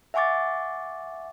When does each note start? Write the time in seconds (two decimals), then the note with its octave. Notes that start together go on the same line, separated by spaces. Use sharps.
0.14 E5 F#5 G#5 C#6 D6 A6